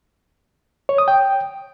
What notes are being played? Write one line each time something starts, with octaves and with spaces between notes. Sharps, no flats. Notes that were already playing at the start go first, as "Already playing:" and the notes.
C#5
D#6
G5